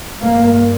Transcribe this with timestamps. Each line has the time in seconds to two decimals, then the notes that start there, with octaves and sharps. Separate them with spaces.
0.21 G2 A#3